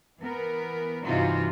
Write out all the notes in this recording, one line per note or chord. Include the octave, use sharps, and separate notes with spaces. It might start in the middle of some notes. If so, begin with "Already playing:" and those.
E3 B3 A#4
G2 C3 E3 D#4 F4 F#4